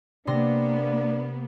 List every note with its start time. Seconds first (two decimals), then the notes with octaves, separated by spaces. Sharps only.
0.27 C3 A#3 B3 D4 C6 A#6